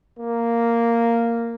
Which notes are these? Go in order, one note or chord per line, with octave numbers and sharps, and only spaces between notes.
A#3